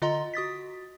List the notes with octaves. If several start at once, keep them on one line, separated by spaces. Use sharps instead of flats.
D3 F4 D#5 A#5 C6
F#4 D#6 A6 B6